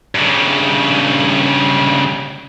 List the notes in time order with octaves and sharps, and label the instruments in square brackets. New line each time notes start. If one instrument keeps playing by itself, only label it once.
[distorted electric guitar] G2 C#3